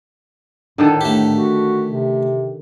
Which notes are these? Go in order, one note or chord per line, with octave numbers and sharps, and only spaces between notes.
A2 D3 D#3 A4
A3 G4
F#4
C3